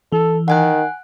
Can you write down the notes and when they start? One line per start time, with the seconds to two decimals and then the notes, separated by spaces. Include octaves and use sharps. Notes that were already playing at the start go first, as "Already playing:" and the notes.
0.12 E3 A4
0.48 D#3 F#5 G#5 F#6